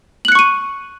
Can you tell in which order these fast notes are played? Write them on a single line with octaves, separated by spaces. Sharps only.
F#7 F#6 C#7 C#6 D#7